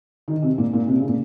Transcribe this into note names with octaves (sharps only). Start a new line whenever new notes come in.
D#3
C3
A#2
A#2
C3
C#3
A#2